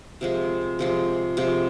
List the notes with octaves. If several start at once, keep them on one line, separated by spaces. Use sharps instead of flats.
C3 F3 G#3
C3 F3 G#3
C3 F3 G#3